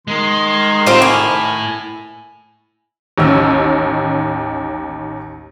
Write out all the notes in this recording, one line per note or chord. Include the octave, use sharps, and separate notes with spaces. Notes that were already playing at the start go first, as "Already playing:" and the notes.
D#3 G#3 C6
A2 C4 F4 G4
E4 G#5
A1 D#2 D#3 C#4 E6 F6